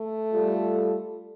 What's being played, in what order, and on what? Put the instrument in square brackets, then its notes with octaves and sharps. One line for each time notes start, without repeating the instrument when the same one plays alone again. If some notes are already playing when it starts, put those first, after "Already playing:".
Already playing: [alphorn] A3
[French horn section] G3 F4 A4